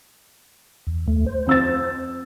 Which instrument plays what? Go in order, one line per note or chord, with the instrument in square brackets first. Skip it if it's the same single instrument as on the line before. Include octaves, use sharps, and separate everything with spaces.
[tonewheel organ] E2
D#2 A3
C5
[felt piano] F2 E6 A6